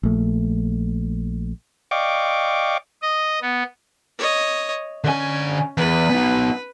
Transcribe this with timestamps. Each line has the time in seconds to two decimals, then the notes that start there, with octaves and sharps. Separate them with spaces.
0.03 A#1 A3
1.91 D5 D#5 F5 G5 C#6 D6
3.02 D#5
3.42 B3
4.19 C#5 D#5
5.04 D3 C#4 G#5
5.77 E2 B4
6.10 B3 D#4